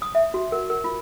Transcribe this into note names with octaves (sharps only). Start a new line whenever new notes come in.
D#6
E5
F#4
A#4
A#4
F4